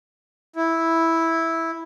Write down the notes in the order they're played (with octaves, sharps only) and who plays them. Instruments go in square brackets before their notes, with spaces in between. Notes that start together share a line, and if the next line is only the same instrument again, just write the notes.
[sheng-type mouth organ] E4